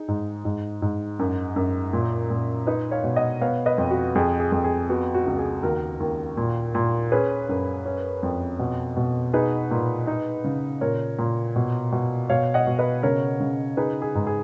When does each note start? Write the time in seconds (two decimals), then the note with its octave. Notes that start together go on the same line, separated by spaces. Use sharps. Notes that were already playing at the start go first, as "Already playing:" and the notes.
Already playing: D#4 G#4
0.08 G#2
0.45 G#2
0.82 G#2
1.19 F#2
1.56 F#2
1.93 A#2
2.30 A#2
2.67 D#4 B4 D#5
2.91 C#5 F5
3.04 B2
3.16 D#5 F#5
3.41 B3 C#5 F5
3.66 B4 D#5
3.78 F2
3.91 F#4
4.15 F2 G#4
4.40 G#4
4.52 F2
4.64 G#4
4.89 B3 F#4
5.14 F#4
5.26 C#2
5.39 G#4
5.63 D#2 F#4 A#4
6.00 D#2
6.37 A#2
6.75 A#2
7.12 C#4 G#4 B4
7.49 F#2
7.85 C#4
8.23 F2
8.59 B2
8.97 B2
9.33 D#4 G#4 B4
9.71 A#2
10.07 D#4
10.44 C#3
10.81 A#2 A#4 C#5
11.19 A#2
11.56 B2
11.92 B2
12.29 B2 C#5 F5
12.54 D#5 F#5
12.67 B2
12.79 B4 D#5
13.03 C#3 A#4 C#5
13.40 C#3
13.77 D#4 G#4 B4
14.02 G#4
14.15 G#2
14.27 G#4